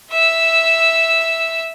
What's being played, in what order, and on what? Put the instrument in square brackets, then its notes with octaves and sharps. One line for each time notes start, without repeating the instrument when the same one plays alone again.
[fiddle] E5 E6